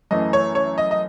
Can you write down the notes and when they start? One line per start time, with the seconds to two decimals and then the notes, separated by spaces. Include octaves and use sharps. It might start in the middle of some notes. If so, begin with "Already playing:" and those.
0.11 F#2 E3 A3 D#5
0.33 C#5
0.55 C#5
0.78 D#5
0.91 D#5